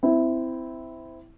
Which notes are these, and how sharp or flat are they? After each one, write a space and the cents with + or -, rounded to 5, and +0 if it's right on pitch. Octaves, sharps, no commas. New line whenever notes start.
C4 -20 E4 +0